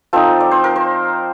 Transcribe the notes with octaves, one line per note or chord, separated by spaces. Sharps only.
F3 C4 D#4 A4
D5
C5
A#4
C5